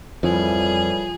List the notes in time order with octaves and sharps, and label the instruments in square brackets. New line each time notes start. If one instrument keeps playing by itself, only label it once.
[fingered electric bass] F2 [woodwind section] A2 E3 G3 [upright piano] F3 [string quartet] G#4